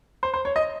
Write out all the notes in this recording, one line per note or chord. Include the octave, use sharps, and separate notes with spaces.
C5
C5
C#5
D#5